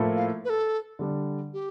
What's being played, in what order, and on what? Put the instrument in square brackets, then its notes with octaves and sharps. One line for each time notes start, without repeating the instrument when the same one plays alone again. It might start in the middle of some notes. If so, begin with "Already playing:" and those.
Already playing: [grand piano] A2 F3 A#3 E4 A4
[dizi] F5
B4
A4
[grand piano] D3 G3 D4
[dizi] G4